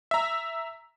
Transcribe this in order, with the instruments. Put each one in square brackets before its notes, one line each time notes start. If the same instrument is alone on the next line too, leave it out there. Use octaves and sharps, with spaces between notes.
[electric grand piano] E5 A#5